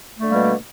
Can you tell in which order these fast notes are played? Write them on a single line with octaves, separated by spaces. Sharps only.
A3 D3 A#3 G3 B2